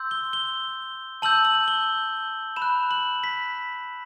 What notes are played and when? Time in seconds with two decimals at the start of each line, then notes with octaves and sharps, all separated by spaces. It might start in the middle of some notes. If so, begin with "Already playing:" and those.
Already playing: C6 E6 G6
0.11 G7
0.33 G7
1.22 A5 E6 G6 F#7
1.45 F#7
1.68 G7
2.56 B5 E7
2.62 F#6
2.91 F#7
3.24 B6